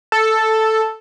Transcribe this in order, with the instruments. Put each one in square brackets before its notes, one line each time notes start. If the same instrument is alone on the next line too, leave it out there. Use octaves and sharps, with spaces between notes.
[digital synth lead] A4